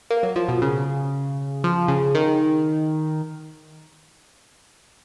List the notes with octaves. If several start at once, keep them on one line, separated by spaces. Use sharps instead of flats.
A#3
F#3
F3
B2
C#3
F3
C#3
D#3